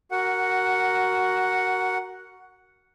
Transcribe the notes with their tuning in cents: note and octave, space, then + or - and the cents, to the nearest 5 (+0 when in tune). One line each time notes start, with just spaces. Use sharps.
F#4 +15 A#4 +0 F#5 +0